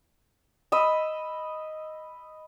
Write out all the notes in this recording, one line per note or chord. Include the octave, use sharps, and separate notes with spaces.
D#5 B5 E6